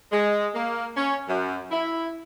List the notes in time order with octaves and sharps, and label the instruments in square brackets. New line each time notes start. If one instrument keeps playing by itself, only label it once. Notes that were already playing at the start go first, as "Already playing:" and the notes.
[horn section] G#3
A#3
C#4
F#2
E4